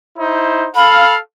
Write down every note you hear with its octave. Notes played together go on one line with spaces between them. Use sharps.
D#4 E4 C5
A4 F5 B5